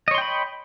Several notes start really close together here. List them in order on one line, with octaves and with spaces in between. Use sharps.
D#5 C#5 C6 G5 B5